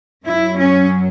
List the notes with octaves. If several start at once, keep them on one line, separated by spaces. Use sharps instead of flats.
F#2 F#3 E4
C#4